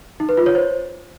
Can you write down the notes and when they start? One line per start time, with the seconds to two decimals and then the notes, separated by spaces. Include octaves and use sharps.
0.20 D#4
0.29 B4
0.37 F4
0.46 C#5
0.55 C5